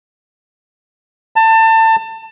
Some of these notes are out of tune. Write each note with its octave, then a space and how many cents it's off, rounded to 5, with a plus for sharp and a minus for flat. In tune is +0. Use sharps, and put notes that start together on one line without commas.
A5 +25